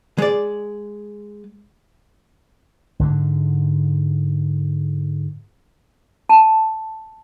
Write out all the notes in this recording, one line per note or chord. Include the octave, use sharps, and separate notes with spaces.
G#3 D5
G#2 D3 G#3
A5